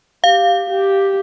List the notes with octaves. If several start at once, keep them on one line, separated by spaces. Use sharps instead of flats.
G4 F5
G4